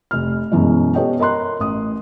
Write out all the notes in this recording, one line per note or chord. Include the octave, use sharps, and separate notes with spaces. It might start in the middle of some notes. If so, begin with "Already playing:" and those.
F1 F6
F#2 B2 E3 G#3
B3 G4 A4 C#5 D#5 G5
A#4 D#5 A#5 C6 F#6
A1 D#6